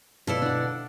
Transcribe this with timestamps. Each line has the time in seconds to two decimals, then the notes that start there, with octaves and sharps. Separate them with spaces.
0.27 B2 E4 A4 D5 F5
0.42 D4 F#5